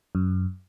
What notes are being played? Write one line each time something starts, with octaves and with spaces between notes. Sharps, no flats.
F#2